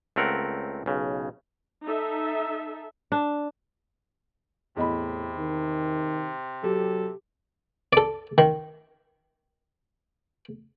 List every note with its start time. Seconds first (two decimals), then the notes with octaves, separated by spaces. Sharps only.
0.16 C#2 A3 C4 A#4 F#5
0.86 B1 C#3
1.83 D#4 A4 E5
3.12 D4
4.76 E2 A2 C3 D#5 B5
5.37 D#3
6.63 F#3 G4 A4
7.93 A4 D5
8.38 D#3